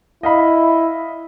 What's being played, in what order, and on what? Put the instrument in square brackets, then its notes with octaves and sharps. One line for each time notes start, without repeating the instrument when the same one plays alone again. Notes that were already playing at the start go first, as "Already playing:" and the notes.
[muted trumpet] E4 [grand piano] D#5 F5 B5